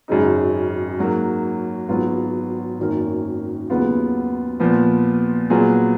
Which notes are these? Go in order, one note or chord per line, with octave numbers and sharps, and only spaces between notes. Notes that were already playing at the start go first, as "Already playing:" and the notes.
G#1 F#2 C#3 G#3 D#4
G#2 F#3 A#3
G#1 G#2 F#3 B3 F4
G#1 F#2 D#3 A#3
D#2 C#3 F#3 B3 F4
A#2 F3 B3
A#2 F#3 B3 F4 G#4